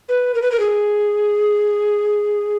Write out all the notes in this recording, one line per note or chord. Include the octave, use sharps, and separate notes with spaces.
B4
A#4
B4
A#4
G#4